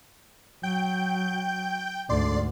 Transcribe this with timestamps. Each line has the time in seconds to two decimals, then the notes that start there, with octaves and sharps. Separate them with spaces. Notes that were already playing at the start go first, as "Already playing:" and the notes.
0.63 F#3 G5 G6
2.09 D2 G#2 D5 C6